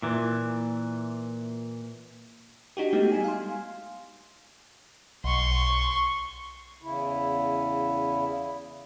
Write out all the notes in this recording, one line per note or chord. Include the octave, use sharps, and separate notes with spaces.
A#2 E3
D4 D#4 F#4 G4
G#3 A3 B3 D#4 G4
G3 D#4 G#5
F5 G#5 C6
B1 C6 C#6
E2 C#3 E4